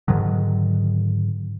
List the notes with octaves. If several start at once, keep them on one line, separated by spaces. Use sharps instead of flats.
G#2 D3 D#3 F#3